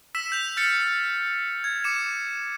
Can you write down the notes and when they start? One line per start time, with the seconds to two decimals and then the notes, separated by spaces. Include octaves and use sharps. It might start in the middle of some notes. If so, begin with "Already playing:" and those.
0.15 E6 B6 E7
0.32 G6 F7
0.57 F6 A6 C#7
1.64 G#6
1.84 D6 C#7 E7